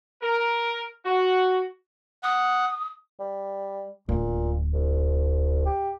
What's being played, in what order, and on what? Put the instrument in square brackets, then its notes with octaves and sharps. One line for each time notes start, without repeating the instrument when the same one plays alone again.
[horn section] A#4
F#4
[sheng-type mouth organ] F#5 [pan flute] D#6
[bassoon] G3
[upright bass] D1 [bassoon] A#2
[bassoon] C2
G4